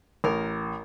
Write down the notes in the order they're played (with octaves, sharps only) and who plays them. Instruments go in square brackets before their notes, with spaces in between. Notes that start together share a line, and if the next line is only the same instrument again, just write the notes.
[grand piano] A1 [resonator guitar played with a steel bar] A#4